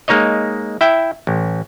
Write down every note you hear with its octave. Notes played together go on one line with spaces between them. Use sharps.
G#3 A#3 D#4 C#5 D#5
E4 E5 G5
A1